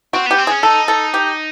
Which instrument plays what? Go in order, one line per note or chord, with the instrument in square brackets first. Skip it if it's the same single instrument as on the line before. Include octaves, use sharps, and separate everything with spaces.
[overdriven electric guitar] C4 [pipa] F#4
[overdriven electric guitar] B3 [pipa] G4
[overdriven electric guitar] C4
[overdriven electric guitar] C#4 [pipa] G#4
[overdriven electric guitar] D#4 [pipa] A4
[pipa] A4
G4